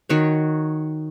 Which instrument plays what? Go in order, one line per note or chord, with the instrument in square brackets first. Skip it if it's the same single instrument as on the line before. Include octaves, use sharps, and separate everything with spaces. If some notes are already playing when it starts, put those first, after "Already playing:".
[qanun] D#3 F#4 C#5